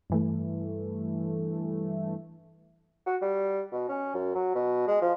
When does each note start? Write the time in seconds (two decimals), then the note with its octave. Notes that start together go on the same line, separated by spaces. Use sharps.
0.10 G2 E3 A3
3.06 F#4
3.21 G3
3.72 B2
3.89 C#4
4.14 F#2
4.35 F#3
4.55 B2
4.87 G#3
5.02 F3